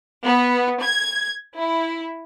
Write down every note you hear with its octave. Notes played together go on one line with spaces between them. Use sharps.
B3
G#6
E4